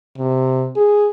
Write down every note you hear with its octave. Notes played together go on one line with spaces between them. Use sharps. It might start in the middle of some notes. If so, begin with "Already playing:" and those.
C3
G#4